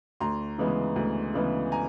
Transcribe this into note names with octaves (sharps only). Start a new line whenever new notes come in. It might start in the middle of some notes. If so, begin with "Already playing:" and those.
D2 A#5 C6
C#3 E3 G#3 B3
D2
C#3 E3 G#3 B3
G#5 A#5